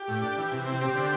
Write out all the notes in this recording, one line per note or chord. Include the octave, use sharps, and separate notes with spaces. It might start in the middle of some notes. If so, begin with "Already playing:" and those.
Already playing: G4
A2
D4
E3
C3
C4
C4 G4
D3